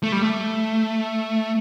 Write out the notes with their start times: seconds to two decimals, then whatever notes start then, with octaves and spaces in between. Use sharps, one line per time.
0.03 A3
0.12 G3
0.22 A3